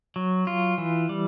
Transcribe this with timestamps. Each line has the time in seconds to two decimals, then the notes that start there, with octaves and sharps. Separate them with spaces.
0.16 F#3
0.47 F4
0.78 E3
1.09 G3